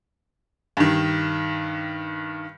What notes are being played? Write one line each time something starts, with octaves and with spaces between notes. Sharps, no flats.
G2 D#3